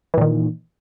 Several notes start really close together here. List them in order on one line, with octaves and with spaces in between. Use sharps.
E3 A#2 D#3